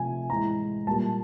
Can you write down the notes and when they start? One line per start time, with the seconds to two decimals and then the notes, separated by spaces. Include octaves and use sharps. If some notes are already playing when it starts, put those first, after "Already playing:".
Already playing: C3 F3 A3 G#5
0.30 A2 E3 G#3 A#5
0.87 A#2 G3 A#3 A5